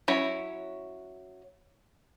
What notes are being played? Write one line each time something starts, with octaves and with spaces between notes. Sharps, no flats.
F#3 C#4 E4 C#5